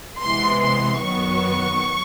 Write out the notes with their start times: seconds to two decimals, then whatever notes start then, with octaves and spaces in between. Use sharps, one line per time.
0.23 C3 E3 G#3 B3 C6
0.62 C6
1.02 F#2 D#3 F#3 B3 C#6